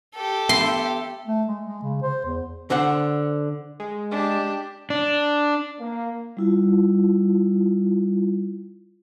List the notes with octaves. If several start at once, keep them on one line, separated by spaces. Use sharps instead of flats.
G4 A4
B3 E5 C6 G6
A3
G#3
G#3
C#3
C5
E2
D3 C5 F#5
G#3
D4 G4
D4
A#3
G3 E4 F4